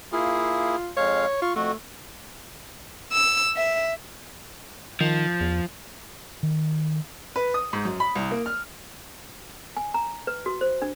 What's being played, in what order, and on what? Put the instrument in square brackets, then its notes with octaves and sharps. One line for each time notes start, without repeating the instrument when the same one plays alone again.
[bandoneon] A#3 E4 G#4 [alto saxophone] F4
[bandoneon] F2 G#3 F5 [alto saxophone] C#5
[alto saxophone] F4 [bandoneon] C#6
[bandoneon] F2 F#4 [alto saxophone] A3
[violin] E6
E5
[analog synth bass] D#3 [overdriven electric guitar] F3
[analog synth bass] E2
[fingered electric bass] D#3
[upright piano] B4
D#6
G#2
F#2
B5
C2
A#3
F6
[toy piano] G#5
A#5
B4
F#4
C5
D4